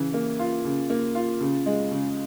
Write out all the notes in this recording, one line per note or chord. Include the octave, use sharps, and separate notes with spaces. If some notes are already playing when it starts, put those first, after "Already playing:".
Already playing: C#3 E3
A#3
F4
C#3
A#3
F4
C#3
G#3
C#3